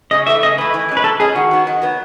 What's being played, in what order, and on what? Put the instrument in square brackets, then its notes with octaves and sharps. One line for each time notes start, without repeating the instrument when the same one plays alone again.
[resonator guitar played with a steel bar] C#3 [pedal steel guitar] D#5
[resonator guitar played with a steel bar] E3 A3 [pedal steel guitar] E5
[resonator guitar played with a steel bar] C#3 [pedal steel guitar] D#5
[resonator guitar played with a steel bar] E3 A3 [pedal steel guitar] B4
[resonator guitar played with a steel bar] E3
G#3 C#4
[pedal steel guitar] B4
[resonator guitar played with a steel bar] E3 [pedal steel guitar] A4
[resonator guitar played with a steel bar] G#3 C#4 [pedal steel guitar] G#4
[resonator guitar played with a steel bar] D#3 [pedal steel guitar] F#4
[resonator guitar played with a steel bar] F#3 B3
D#3
F#3 B3